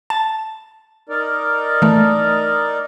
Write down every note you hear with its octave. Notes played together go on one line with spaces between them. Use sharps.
A5
D#4 A#4 D5
E3 A3